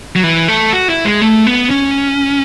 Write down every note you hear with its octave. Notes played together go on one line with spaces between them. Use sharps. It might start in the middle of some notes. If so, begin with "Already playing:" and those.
F#3
E3
A3
F#4
E4
G#3
A3
B3
C#4